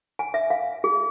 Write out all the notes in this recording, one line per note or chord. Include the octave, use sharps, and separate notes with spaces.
G#5
E5
F5
G#4